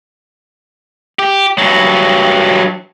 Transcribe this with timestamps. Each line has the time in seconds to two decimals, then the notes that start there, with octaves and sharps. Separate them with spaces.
1.19 G4
1.59 G2 F#3